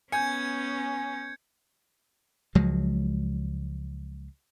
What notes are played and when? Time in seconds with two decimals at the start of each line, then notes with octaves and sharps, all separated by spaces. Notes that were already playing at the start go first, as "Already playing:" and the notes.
0.12 B3 C#4 G#5 G6 G#6 C#7
2.55 C#2 F3 F#3 G#3